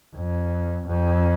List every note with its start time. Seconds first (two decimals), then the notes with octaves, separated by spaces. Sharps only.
0.16 F2
0.87 F2